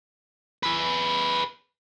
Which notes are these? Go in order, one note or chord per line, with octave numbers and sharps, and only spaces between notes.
G#4 B4